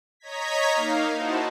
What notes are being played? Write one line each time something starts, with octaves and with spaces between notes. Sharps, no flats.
C#5 D#5 A#5 G#6 B6
A#3 D#4 F5
D#4 E4 F#4 C5 A5